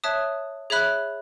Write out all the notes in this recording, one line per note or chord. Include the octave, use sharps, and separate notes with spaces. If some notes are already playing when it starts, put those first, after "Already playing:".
C#5 E5 A5 D#6 F#6
G#4 C#5 E5 B5 F#6